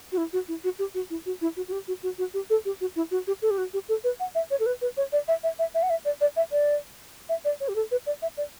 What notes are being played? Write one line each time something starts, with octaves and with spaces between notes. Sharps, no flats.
F#4
E4
F#4
E4
F#4
G4
F#4
E4
F#4
E4
F#4
F#4
G4
F#4
F#4
F#4
G4
A4
G4
F#4
E4
F#4
G4
A4
G4
F#4
G4
A4
B4
F#5
E5
C#5
A4
B4
B4
C#5
D5
E5
E5
E5
E5
F#5
E5
D5
D5
E5
D5
E5
D5
C#5
G4
A4
B4
D5
E5
D5